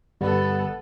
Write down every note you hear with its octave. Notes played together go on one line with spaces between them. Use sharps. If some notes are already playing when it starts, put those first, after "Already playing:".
G1 G3 B3 A4